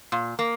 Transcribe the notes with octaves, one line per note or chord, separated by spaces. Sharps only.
A#2
A#3